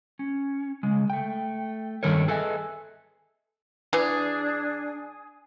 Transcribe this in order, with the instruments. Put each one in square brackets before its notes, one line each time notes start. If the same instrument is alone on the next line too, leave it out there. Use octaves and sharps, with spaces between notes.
[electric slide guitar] C#4
C#3 G#3
A3 G5
G2 B2 D#3 A4 A#4 C#5
G#4 A4 B4 D#5 E5 G#5
[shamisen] E3 [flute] D4 [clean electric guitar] G#4